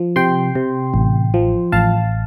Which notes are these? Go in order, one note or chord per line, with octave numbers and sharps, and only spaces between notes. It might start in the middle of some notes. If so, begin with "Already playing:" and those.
Already playing: F3
C3 G5 C6
C3
A1
F3
A1 F5 A5